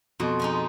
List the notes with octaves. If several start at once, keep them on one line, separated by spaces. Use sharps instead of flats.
F2 B2
F3 G#3 D#4